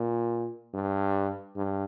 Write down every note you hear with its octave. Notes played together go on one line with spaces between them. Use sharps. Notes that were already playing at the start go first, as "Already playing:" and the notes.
Already playing: A#2
G2
G2